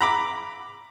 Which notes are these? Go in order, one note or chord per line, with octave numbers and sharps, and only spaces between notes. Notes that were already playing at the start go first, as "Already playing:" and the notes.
A#5 B5 D6